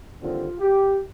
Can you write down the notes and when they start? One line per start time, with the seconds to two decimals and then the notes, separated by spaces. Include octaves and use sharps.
0.20 D#2 D3 G3 C4 F4
0.60 G4